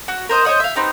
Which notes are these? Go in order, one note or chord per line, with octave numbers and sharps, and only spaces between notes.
F#4
A#4 C5 D#5 D#6
C5 C#5 D#5 F#5
E5 F5
B3 C4 D#4 G4